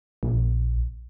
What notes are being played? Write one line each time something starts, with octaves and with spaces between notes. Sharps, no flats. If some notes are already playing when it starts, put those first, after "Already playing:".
A#1